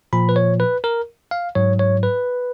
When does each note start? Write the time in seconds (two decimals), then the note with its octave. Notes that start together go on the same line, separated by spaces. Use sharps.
0.13 A#2 F3 B5
0.29 B4
0.36 C#5
0.60 B4
0.84 A#4
1.31 F5
1.55 G#2 F#3 C#5
1.79 C#5
2.03 B4